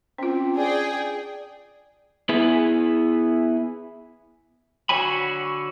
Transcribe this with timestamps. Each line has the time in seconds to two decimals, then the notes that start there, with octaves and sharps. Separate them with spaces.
0.18 C4 C#4 F4
0.56 D4 G#4 D5 G5
2.29 B3 E4 G#4
4.89 D3 F#4 C#5 G#5 B5